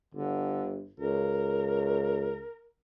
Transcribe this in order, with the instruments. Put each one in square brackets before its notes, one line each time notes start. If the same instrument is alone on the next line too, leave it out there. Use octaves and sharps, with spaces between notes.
[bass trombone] G1 [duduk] D3
[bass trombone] C#2 [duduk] A#4